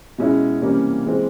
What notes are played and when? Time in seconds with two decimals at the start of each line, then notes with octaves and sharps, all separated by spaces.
0.18 B2 G#3 C#4 E4
0.62 C3 E3 G3 A#3 C#4
1.06 E3 G#3 C4